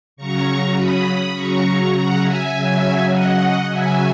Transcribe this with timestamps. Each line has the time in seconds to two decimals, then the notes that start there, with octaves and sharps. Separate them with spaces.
0.16 C#3 F#3 A#5 C#6
0.75 B5 D#6
1.34 C#3 F#3 A#5 C#6
1.92 F#5 A#5
2.22 E5 G#5
2.51 C#3 F#3
3.10 D#5 F#5
3.69 C#3 F#3 E5 G#5